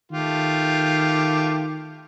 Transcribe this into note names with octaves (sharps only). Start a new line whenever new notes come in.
D#3 A3 F4 G4